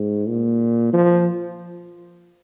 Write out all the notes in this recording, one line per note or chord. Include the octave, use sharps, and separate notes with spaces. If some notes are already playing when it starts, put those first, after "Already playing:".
Already playing: G#2
A#2
F3